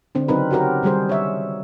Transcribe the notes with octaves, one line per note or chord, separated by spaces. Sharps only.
D3 C4 D4
C#3 F#3 C4 D#4 A#4 B4
C#4 F#4 G4 A#4 C5
D#3 G3 G#3 G#4 C5
C#5 E5